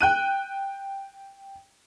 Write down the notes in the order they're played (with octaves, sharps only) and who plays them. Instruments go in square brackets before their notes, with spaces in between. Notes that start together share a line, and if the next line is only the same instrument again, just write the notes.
[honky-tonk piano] G5 F#6 D#7